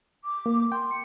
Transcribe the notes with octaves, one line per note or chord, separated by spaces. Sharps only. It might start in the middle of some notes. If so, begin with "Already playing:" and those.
D6
A#3
G5 C6
C#7